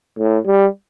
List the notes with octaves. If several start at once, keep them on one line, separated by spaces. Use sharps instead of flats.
A2
G3